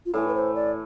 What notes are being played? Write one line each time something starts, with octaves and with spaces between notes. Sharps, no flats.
F4
A2 E3 A3 E4
B4
C5
D5